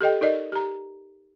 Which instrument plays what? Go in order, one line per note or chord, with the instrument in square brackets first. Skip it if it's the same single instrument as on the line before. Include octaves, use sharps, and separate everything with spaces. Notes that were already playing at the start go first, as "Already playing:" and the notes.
[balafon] G4 A4 D#5 G5
D#4 A#4 D5 D#5
G4 A#5